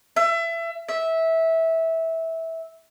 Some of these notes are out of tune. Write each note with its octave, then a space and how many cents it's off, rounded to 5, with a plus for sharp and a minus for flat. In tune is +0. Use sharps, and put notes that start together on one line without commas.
E5 +25
E5 -15